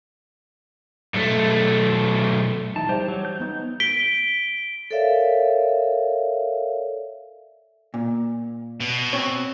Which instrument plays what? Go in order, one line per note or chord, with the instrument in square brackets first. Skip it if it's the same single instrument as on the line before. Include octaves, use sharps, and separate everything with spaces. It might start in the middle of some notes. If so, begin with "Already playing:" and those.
[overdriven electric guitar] B1 A3
[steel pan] E3 D#4 [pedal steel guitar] A5
[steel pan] G3 [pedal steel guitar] G4 C5
[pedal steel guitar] F#3
G6
[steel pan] B3 D#4
[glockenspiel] B6 D7 G7
[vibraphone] A4 A#4 C#5 D5 E5 F5
[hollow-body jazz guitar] A#2
[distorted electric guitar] B2
[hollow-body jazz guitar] C4 C#5